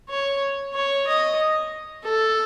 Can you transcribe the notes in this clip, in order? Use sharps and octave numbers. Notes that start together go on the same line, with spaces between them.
C#5
C#5
D#5
A4